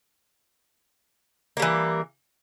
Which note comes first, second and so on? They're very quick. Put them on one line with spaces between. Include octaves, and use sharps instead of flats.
A#3 G3 E3